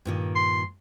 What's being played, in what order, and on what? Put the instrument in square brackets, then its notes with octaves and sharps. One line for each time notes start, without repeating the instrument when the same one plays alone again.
[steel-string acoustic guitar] G2 A#2 D#3
[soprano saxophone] C6